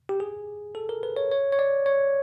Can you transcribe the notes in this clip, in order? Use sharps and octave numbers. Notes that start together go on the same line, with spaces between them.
G4
G#4
A4
A#4
B4
C#5
C#5
C#5
D5
C#5